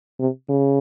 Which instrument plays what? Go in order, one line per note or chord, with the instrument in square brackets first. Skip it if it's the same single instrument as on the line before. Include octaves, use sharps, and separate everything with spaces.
[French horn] C3
C#3